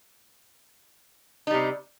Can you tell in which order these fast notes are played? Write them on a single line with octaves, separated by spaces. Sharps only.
D#4 G3 C3